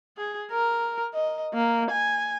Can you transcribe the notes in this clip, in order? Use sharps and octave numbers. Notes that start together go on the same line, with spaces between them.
G#4
A#4
D#5
A#3
G#5